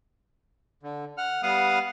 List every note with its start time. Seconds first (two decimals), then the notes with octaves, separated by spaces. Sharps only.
0.83 D3
1.18 F#5 F6
1.43 G3 B3 F5 F#5 D#6 F6